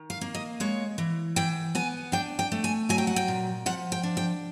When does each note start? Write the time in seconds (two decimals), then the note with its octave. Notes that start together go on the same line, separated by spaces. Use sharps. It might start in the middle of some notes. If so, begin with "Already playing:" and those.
Already playing: D#3
0.10 F5
0.21 A#3
0.35 D#5
0.60 G#3 C#5
0.98 E3
1.36 E3 G5
1.75 B3 G#5
2.12 D4 G5
2.39 G5
2.52 A3
2.64 G#5
2.89 F#3 G#5
2.98 G5
3.07 F#5
3.16 G5
3.28 A#2
3.66 F3 F#5
3.92 G5
4.03 D4
4.17 G5